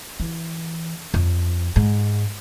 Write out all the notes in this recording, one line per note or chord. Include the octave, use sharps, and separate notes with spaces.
E3
F2
G#2